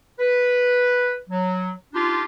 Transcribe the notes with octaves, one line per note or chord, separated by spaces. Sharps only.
B4
F#3
D4 D#4 F4 G4